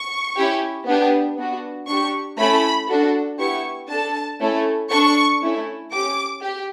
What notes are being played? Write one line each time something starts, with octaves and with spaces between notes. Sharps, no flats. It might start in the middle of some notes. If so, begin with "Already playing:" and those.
Already playing: C#6
C#4 E4 G4
B3 D4 G4
B3 D4 F#4
D4 G4 C#6
A3 C#4 E4 A4 B5
D4 F#4 A4
B3 E4 G4 C#6
D4 A4 A5
A3 C#4 E4 A4
D4 A4 C#6
A3 C#4 E4
C#4 G4 D6
G4